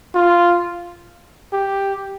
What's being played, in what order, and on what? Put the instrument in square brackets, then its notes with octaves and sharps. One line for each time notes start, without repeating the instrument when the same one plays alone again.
[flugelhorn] F4
G4